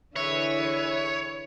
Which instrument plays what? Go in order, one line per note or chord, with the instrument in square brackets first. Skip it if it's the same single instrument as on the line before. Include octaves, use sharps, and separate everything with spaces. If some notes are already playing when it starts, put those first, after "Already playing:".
[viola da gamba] D3 E3 G#4 [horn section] B4 E5 [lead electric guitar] C#5